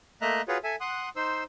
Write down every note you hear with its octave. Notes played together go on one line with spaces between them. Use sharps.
A3 A#3 D#5 E5 A#5 F#6
F4 F#4 G#4 B4 C#5
A4 E5 G#5
F#5 C6 D#6 F#6
D#4 C5 C6 E6